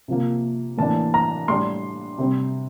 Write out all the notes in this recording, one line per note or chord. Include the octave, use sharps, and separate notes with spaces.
C3 F3 A#3
A2 E3 A#3 D4 A5
A#5
A2 G3 D4 C6
C3 G3 C4